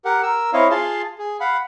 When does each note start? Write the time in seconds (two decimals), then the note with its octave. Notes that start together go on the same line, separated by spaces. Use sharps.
0.05 G4 A#4 F#5
0.23 A#4 E6
0.53 C4 E4 C#5 D#5 F5
0.70 F4 G#4 F5 A5 C6
1.18 G#4
1.40 F5 F#5 B5